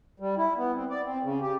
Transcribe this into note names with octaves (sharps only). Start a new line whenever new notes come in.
G3
E4
B3
C4
D5
C4
C#3
G4